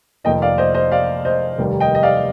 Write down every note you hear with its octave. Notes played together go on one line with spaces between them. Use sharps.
F1 F2 D#3 A#3 D#5 G5
D5 F5
C5 D#5
C5 D#5
D5 F5
C5 D#5
F1 D#2 D#3 G3 A#3
D#5 G5
D#5
D5 F5